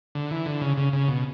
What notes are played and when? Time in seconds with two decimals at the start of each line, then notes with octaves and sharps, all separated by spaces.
0.15 D3
0.31 E3
0.46 D3
0.61 C#3
0.77 C#3
0.93 C#3
1.08 B2